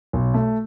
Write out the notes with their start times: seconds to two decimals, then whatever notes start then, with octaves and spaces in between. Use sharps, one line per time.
0.13 B1
0.34 A3